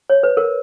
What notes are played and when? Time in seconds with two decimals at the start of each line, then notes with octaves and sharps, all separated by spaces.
0.10 C#5
0.23 B4
0.37 A#4